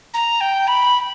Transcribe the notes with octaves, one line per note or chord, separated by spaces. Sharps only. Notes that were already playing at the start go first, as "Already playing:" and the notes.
A#5
G5
B5